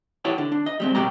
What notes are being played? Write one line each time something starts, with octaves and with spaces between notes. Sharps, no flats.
E4 G4 C#5 F#5 A5
D3
D4
D#5
G3 G#3 C4
C2 B2 F#3 G4 A#5